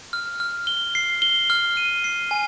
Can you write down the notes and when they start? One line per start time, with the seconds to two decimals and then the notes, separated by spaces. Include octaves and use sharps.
0.13 F6
0.40 F6
0.67 G7
0.95 C7
1.22 G7
1.50 F6
1.77 D#7
2.04 C7
2.31 G#5